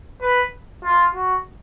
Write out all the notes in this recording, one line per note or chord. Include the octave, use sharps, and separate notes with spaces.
B4
F4
F#4